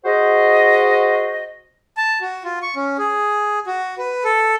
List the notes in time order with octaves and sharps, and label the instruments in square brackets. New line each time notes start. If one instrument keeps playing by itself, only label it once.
[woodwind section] F#4 G#4 C5 D#5
[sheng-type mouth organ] A5
F#4
F4
C#6
C#4
G#4
F#4
B4
A4